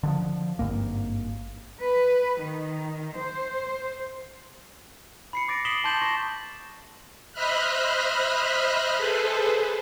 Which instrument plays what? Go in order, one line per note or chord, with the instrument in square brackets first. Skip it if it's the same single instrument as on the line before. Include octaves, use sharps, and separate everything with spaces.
[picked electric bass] D3 D#3 F3
G#1 G2 A#3
[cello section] B4
D#3
C5
[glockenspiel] B5 C7 C#7
D6 A6 A#6 D7
D#6 B6 C7 E7 F#7 G7
A5 C6 G6 A6 E7 F#7
C#6 A#6 E7
[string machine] C5 D#5 E5 B5 F6 F#6
G#4 A4 B4 C5